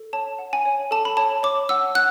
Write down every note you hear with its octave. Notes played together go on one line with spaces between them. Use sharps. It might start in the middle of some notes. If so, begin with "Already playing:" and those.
Already playing: A4
C#5 A5
F#5
G#5
C#5
A4 A5
B5
C#5 A5
C#5 D6
F#5 E6
F#5 F#6